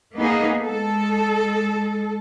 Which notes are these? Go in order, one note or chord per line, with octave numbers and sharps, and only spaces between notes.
A#3 B3 D#4 G#4
G#3 A4